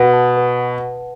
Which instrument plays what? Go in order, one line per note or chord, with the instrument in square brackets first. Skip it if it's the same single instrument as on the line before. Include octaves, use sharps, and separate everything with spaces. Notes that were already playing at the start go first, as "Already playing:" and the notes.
Already playing: [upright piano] B2 [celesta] B4 F#5
[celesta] A5
B4